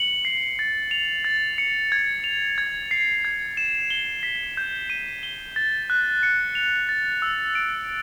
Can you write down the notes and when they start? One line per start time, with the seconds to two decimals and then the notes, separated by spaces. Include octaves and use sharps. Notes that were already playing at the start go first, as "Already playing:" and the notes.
Already playing: C#7 F#7
0.25 C7
0.59 A6
0.91 F7
1.25 A6
1.58 C#7
1.92 G#6
2.24 F7
2.58 G#6
2.91 C7
3.25 G#6
3.57 E7
3.91 G7
4.23 B6
4.57 G6
4.90 D#7
5.23 G7
5.56 A6
5.90 F#6
6.23 C#7
6.55 F7
6.89 A6
7.22 E6
7.55 D7